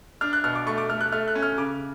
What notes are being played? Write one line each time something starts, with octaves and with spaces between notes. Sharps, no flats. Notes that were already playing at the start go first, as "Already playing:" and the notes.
D4 F6
F#6
B2 F6
D6
A3 C#6
D6
A3 F6
F#6
A3 F6
F#6
C#4
F6
C#3 D6